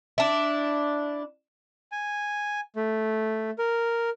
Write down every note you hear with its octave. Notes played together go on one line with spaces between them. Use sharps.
D4 E4
G#5
A3
A#4